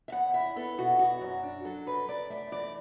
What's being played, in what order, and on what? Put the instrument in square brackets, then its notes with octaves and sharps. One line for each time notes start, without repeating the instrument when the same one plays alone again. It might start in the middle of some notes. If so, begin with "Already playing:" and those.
[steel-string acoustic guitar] E5
E2 F#5
E4 E5
B3 A4
B2 F#4
E2 F#4
F#2
D4
F#3 A4
F#2 B4
F#2 D5
A3 E5
E3 D5